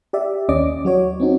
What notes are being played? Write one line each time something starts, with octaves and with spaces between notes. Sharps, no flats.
G4 D5 E5
D#2 C#4 D5 D#5 D6
F#3 F#4 C#5
C4 C#4 D#4 F#4